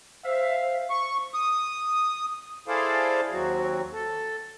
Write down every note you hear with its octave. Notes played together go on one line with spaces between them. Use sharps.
C5 E5 F5
C#6
D#6
E4 G#4 A4 C5 D5 F5
D#2 F#3 C4 F#4
A4